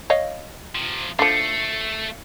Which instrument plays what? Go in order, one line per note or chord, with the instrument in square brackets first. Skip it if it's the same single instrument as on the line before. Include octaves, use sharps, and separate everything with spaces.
[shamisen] C#5 D#5 F5
[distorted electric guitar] C3 F3
[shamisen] D3 F3 [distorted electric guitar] A3 [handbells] C7 C#7